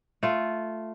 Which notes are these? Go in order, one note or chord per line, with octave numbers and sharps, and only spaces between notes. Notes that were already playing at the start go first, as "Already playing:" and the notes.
A3 F4